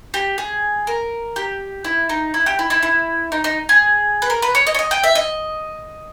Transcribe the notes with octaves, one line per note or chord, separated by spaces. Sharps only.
G4
G#4
A#4
G4
E4
D#4
E4
G4
E4
E4
E4
D#4
D#4
G#4
B4
A#4
B4
C#5
D#5
C#5
D#5
G5
E5
D#5